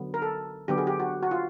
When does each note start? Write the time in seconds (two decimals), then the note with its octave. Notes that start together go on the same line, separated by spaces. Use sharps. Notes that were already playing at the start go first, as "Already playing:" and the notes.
Already playing: D3 F#3 B3
0.14 A#4
0.22 A4
0.68 D3 F#3 B3 G4
0.78 G#4
0.87 G4
1.00 F#4
1.23 F#4
1.31 F4